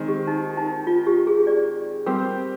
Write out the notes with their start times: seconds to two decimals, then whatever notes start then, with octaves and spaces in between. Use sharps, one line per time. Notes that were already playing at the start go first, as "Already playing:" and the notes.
Already playing: D#3 G#3 C4
0.08 G4
0.27 D#4
0.57 D#4
0.87 F4
1.07 G4
1.27 G#4
1.47 D5
2.06 G3 C4 G4 A#4 C5